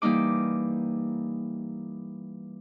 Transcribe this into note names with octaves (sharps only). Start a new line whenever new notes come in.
E3 G3 A#3 D#4 D6